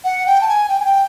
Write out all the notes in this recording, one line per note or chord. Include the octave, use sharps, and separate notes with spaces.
F#5
G5
A5
G#5
G5
G#5
G5